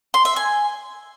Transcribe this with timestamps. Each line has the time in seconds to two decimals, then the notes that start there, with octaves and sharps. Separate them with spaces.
0.14 C6
0.25 E5
0.36 G#5